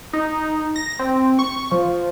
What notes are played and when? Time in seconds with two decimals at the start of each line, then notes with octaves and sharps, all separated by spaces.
0.13 D#4
0.76 A#6
0.99 C4
1.39 C#6
1.71 F3